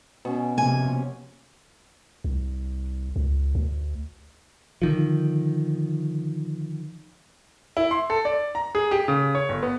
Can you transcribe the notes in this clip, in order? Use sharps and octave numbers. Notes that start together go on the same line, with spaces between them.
B2 C#4
C3 F3 A#3 G#5
C2
C#2
D2
D3 D#3 F3
E4
C6
A4
D5
A#5
G#4
G4
C#3
C#5
G1
B3